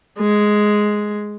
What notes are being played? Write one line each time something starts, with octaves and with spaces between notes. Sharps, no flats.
G#3